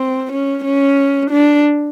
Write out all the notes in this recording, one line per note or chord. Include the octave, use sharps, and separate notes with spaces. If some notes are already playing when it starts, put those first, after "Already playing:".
Already playing: C4
C#4
C#4
D4